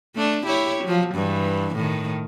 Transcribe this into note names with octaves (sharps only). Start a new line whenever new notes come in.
A3 D4
E4 G4 C#5
F3 F#3
G2 E3
A2 D#3